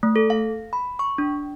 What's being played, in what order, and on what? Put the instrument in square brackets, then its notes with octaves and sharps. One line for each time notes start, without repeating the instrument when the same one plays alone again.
[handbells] A3
A4
F5
B5
C#6
D4